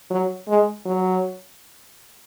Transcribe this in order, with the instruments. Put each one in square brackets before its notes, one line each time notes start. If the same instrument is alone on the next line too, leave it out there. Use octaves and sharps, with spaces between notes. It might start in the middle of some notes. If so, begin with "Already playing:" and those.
[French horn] F#3
G#3
F#3